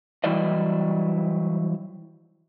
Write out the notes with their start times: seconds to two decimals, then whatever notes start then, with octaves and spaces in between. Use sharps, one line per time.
0.24 E3 F#3 G3 E4 D5 D#5